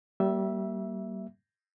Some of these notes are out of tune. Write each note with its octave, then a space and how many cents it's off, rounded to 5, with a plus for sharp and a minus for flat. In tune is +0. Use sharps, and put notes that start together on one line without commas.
G3 -30 A#3 +0 E5 +0